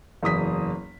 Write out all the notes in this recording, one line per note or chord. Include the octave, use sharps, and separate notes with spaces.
F#1 E2 D#6 B6